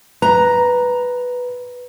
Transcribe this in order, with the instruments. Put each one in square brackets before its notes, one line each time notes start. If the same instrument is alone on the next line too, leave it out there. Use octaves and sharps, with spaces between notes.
[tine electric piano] B4 [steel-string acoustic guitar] A#5